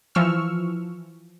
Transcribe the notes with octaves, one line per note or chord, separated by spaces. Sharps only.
E3 F3 C#6 E6 F6